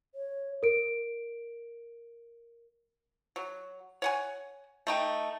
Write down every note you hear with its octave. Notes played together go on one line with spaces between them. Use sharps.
C#5
A#4 D7
F#3
C#5 F#5 G#5
A3 D#4 G5